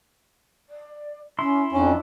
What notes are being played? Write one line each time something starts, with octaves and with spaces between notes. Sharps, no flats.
D5
C#4 E4 C6
F2 C#4 D4